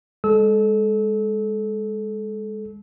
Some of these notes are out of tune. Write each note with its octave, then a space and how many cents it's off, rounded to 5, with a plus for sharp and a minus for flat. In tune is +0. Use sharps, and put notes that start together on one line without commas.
G#3 -20 A4 -25 E6 -30